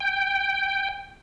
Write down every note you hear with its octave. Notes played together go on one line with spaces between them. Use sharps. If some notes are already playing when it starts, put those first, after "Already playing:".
G5